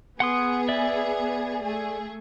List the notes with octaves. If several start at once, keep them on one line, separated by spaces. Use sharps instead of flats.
B3 G#4 F#5 C6 D#6
D5 E5
A3 G#4